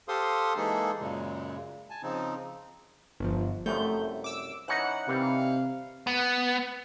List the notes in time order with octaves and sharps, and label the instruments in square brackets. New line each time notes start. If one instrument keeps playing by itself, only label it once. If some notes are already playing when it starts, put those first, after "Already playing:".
[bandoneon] G4 A4 C5 F5 C6 D#6
E3 G#3 A#3 D#4 G#4 A4
F#2 A#2 C#3 G#3
G#5 A5
C#3 F3 C4 D#4
[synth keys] G1 F3
[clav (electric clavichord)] C2 F#2 F3 [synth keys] A3 G6
[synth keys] D6 E6
[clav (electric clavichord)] E3 C#4 D#4 [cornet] F#5 [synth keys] F#6 C#7
[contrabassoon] C3 [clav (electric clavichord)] D#3 E3 G3 [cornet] F5
[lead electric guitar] B3